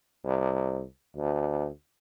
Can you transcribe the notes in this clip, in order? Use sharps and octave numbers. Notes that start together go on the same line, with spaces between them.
C2
D2